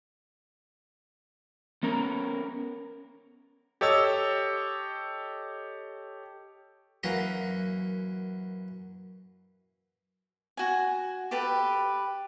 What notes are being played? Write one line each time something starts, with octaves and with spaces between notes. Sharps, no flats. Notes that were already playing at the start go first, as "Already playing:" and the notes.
B3 C#4 A#4 A#5
G4 A4 C#5 D#5 E6
F#2 E3 A#3 F#4 A#5
F#4 G#5
G4 A4 B4 G5